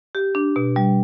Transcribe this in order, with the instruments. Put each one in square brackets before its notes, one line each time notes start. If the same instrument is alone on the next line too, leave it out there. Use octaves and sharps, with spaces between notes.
[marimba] G4
D4
B2
G3